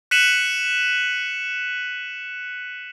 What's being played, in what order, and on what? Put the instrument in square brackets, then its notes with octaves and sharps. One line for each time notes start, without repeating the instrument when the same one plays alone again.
[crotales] F#6 B6 C#7 D#7 E7 F#7